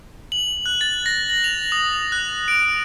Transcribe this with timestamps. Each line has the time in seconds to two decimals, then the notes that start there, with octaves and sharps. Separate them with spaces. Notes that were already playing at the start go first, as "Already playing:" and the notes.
0.32 F#7
0.66 F#6
0.81 A6
1.06 A#6
1.30 F#7
1.44 F7
1.72 D#6
2.12 F#6
2.48 D7